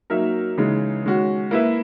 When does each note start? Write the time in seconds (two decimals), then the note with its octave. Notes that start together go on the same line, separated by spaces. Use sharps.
0.10 F#3 A#3 D#4 A#4 E5
0.58 C#3 E3 G#3 D#4
1.04 D#3 G#3 C#4 F#4
1.51 A#3 E4 B4 E5